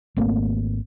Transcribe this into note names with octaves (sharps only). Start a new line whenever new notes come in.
G#1 A3 A#3 C4